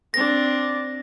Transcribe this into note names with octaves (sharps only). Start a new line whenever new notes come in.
C4 D4 A#6